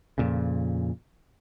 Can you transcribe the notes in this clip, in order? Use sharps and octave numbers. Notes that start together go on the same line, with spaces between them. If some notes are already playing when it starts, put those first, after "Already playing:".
F2 A#2 C#3